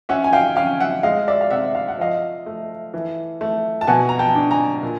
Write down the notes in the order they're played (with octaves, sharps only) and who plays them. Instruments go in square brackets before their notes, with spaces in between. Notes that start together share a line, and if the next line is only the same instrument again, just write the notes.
[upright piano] C#4 E5 F#5
G#5
F5 G5
C#4 F5 G5
E5 F#5
G#3 D#5 F5
D5 E5
F5
C3 E5 F#5
F5
F#5
F3 D#5 F5
A3
E3
A3
A5
B2 F#5 G#5
A#5
G5 A5
D4
G#5 A#5
A#2